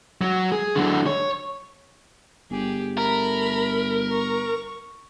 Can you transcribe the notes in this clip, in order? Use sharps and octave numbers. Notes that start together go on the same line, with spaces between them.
F#3
G#4
D3 F#3
C#5
G1 G4 G#4
A3 A#4 B5
C#6